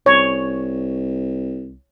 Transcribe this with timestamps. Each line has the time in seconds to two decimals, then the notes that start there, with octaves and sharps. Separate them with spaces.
0.06 C2 C#5